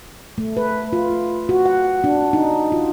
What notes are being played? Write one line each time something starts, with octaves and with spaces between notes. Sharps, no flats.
A3
B4
F4
F#4
F#5
D4
D#4
F4